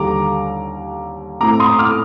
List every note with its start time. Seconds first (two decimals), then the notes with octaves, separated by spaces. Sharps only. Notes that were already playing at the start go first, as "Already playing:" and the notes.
Already playing: D#2 D3 G3 A#5 D6
1.41 A2 A3 C4 A#5 D6
1.60 C6 D#6
1.79 D6 F6